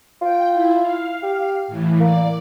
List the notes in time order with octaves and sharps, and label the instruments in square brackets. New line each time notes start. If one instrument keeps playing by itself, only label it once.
[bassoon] F4 [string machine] G5
[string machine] E4
F5
[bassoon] G4
[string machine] A2 E3
[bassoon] A#3 [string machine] D5